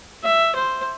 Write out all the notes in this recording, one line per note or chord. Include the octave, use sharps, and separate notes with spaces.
E5
C5